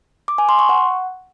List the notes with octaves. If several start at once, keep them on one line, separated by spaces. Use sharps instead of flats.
D6
G#5
C6
C#6
F#5